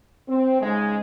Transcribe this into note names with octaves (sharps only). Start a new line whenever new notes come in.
C4
G#2 C#3 G#3